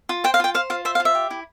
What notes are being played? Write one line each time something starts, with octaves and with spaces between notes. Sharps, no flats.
F4
C5 G5
F5
F4 G5
C5 F5
F4 F5
C5 E5
F5
F4
E5
G4
E4